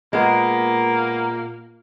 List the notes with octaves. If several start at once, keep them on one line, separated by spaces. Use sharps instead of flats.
A#2 G#3 A#3 B3 A#5